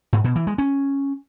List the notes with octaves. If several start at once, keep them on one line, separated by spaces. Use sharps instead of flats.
G#2
B2
E3
G#3
C#4